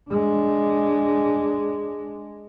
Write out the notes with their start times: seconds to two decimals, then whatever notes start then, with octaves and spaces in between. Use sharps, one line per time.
0.10 G#3 D4